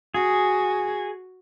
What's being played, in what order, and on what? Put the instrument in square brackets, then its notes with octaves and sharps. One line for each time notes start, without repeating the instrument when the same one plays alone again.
[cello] F#4 [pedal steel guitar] G#4